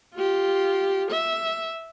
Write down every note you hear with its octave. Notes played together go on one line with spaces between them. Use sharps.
F4 G4
E5